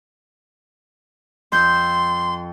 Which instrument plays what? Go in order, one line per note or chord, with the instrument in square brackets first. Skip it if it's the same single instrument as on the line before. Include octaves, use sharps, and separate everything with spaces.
[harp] F2 G6 [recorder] C6